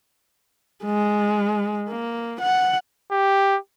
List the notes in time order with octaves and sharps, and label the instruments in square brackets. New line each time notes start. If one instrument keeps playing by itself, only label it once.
[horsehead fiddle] G#3
A#3
F#5
[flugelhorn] G4